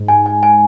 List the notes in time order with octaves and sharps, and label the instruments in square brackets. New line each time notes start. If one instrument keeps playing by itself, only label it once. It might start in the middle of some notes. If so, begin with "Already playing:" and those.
Already playing: [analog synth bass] G#2
[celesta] G#5
G#5
G#5